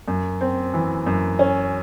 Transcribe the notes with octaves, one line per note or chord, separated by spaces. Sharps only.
F#2
C4
E3
F#2
C#4